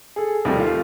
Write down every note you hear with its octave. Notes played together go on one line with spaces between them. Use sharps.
G#4 A4
D#2 C3 F3 G3 A3
A3 F4